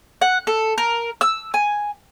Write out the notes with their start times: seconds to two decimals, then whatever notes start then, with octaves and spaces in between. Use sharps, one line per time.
0.21 F#5
0.47 A4
0.78 A#4
1.21 E6
1.54 G#5